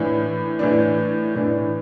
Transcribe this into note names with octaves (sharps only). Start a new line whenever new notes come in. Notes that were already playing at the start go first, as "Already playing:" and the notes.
Already playing: A2 E3 D4
A2 E3 D4
A2 E3 D4